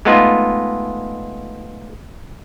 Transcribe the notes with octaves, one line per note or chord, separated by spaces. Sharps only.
G#3 A3 B3 D#4 F4